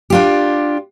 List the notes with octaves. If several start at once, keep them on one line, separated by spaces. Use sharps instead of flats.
D4 F4 G4